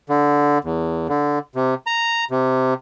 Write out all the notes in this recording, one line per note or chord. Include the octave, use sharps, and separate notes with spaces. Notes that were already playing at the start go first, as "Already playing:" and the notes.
D3
E2
D3
C3
A#5
C3